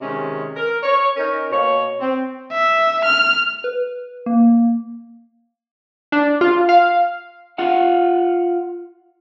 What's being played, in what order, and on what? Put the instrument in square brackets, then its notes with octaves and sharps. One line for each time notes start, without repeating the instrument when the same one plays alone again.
[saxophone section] C3 D#3 G#3 C#4
A#4
C#5
C#4 D#4 A#4
B2 A#3 C#5
C4
[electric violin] E5
F6
[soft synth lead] B4
A#3
[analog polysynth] D4
F4
F5
[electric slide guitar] F4 F5 F#5